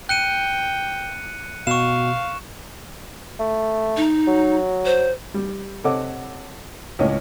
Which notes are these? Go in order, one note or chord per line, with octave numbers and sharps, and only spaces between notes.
G5 F#6 C#7 D#7
B2 F5 C#6 E7
A3
D#4
F#3
C5
G3
C3 A4 C#5 D#5 F#5 D6
C#2 A2 C#4 D#5